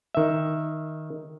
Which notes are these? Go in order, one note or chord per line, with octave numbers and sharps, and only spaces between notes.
D#3 E5